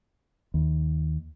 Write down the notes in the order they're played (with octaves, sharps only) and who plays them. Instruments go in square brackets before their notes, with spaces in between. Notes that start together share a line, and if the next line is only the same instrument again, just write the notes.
[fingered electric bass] D#2